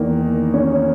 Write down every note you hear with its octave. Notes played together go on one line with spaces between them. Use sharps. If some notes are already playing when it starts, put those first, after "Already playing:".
Already playing: E2 D#3 A#3
C#4